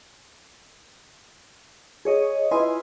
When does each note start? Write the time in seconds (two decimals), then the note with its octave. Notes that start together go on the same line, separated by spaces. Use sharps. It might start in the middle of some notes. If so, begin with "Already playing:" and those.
2.05 G#4 C#5 D#5
2.51 E4 F4 B4 D#5 G#5 C6